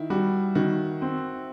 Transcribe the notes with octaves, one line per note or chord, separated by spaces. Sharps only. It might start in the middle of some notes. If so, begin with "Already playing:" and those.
Already playing: D#3 E4
G3 F#4
D#3 F#4
C4